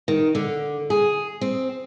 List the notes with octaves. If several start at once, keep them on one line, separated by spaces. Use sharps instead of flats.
D#3
D3
G#4
C4